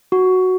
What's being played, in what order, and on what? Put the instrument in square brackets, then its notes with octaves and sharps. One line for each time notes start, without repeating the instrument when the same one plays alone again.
[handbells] F#4